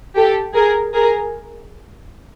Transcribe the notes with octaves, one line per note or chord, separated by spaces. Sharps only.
G4 A4
G#4 A#4
G#4 A#4